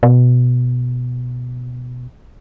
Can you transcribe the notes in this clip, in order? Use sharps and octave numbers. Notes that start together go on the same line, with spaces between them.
B2